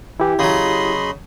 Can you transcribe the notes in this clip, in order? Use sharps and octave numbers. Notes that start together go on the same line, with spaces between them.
E3 E4 G4
C#3 F#3 D#5 B5 C6